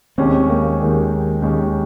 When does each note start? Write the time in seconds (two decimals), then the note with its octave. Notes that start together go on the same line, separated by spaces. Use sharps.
0.18 D#2 D#3 G#3 C4 C#4 G4
0.50 A#3
0.80 D#2 D#3 G#3 C#4 G4
1.42 D#2 D#3 G#3 C#4 G4